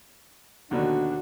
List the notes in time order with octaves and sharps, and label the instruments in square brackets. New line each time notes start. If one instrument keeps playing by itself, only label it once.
[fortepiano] D#2 B2 D3 [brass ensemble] D4 [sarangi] F#4